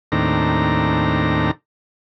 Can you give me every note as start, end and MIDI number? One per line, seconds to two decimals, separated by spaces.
0.12 1.51 39
0.12 1.51 45
0.12 1.51 60
0.12 1.51 62
0.12 1.51 82